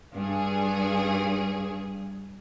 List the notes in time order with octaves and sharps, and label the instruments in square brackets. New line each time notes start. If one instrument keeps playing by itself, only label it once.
[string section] G2 G#4